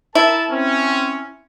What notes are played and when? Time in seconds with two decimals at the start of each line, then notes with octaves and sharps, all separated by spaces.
0.15 E4 A#4 A5
0.50 C4 C#4